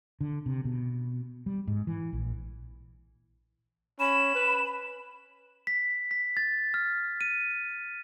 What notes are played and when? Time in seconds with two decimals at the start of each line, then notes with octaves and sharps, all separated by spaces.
0.21 D3
0.46 C3
0.65 B2
1.46 G3
1.67 G#2
1.87 E3
2.13 A#1
4.00 C#4 B5 E7
4.35 B4
5.67 B6
6.11 B6
6.37 A6
6.74 F6
7.21 D#7